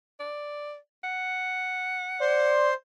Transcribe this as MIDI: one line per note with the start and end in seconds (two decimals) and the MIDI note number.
0.20 0.76 74
1.04 2.52 78
2.21 2.74 72
2.21 2.70 74
2.21 2.74 84